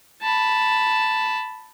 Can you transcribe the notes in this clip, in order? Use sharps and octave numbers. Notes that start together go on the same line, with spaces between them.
A5 B5